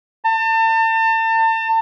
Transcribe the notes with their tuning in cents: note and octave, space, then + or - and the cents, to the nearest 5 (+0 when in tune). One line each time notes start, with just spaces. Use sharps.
A5 +35